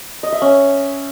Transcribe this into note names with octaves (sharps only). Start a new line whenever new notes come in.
D#5
E5
C#4